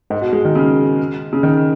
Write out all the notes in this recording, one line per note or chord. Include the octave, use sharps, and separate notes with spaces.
G#2
B2
G#3
D#3
C#3
C#3
D#3